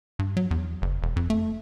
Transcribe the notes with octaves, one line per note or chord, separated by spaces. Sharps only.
G2
F#3
E2
F#1
E1
F2
A3